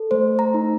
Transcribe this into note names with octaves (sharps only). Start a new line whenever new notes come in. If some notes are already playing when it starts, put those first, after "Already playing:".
Already playing: A4
A3 C5
A#5
D#4